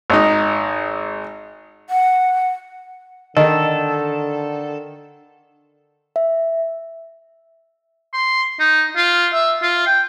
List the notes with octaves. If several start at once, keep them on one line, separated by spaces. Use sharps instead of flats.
G#1 D#4
F#5
D3 D#3 A4 D#5
E5
C6
D#4
F4
E5
F4
G5